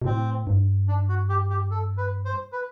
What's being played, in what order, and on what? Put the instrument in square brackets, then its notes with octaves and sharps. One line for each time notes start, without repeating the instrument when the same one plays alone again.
[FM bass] B2
[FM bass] A2 [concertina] C4
[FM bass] G2
[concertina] D4
F#4
G4
G4
A4
B4
C5
B4